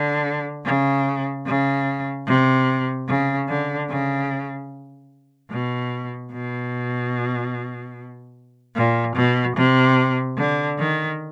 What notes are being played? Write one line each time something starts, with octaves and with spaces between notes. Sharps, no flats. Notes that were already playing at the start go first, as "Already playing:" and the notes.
Already playing: D3
C#3
C#3
C3
C#3
D3
C#3
B2
B2
A#2
B2
C3
D3
D#3